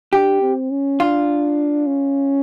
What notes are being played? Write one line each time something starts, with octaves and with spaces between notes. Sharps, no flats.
D4 G4
C4
C#4
D4 F4
C#4